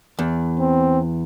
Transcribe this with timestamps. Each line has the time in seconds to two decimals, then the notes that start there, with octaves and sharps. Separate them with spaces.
0.19 E2
0.59 C4